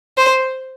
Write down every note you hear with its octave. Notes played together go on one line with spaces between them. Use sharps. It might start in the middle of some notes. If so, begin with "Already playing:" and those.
C5